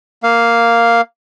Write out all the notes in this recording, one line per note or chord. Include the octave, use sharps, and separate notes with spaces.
A#3 F5